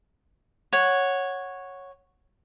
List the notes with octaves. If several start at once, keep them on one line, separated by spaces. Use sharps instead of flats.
C#5 F#5